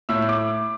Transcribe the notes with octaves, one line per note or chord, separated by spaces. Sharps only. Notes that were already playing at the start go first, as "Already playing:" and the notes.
A2 E5 E6
D6